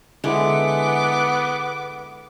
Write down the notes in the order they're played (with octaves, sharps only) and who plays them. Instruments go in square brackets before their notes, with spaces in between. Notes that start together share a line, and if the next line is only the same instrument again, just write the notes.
[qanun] D3 G#3 E4 [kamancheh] B3 D6